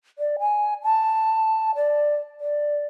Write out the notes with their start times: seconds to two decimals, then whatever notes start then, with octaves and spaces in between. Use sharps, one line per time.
0.19 D5
0.39 G#5
0.84 A5
1.76 D5
2.40 D5